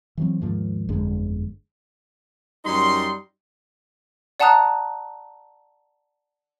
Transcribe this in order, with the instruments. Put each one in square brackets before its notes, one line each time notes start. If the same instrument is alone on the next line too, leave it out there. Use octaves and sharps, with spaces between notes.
[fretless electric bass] E3 F#3 C4
D#2 G#2 F3 A#3
G1 F2 D3 G#3
[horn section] F#2 G3 D#4 C6
[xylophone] D5 F#5 A5 A#5 D#6 F#6